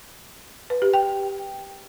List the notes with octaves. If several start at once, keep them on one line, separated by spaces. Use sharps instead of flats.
B4
G4
G5